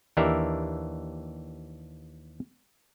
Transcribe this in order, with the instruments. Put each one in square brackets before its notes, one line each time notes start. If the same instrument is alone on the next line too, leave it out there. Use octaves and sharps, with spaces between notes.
[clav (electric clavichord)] D#2 E3 D4 G4 A#4 E5